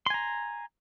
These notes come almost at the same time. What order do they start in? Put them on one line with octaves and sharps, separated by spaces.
C6 G#5 A#5